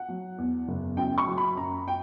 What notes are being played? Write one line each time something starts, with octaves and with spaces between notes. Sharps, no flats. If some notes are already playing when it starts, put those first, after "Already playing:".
Already playing: F#5
F#3
E2
F#1
F#2 G5
C#6
F#3
B5
F#2 A#5
G5